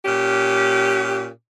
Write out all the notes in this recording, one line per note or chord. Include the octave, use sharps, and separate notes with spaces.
A#2 C#4 G4